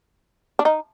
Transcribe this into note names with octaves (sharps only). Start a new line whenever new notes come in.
D4
D#4